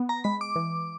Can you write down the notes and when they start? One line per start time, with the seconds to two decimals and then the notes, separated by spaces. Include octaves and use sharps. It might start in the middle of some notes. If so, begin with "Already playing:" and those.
Already playing: B3
0.09 A#5
0.24 G#3 B5
0.41 D6
0.56 E3